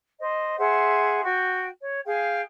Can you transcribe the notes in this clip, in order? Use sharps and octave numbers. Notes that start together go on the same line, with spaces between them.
C5 D#5
G#4 C5 E5 F#5
F#4 G5
C#5
G#4 F5 G5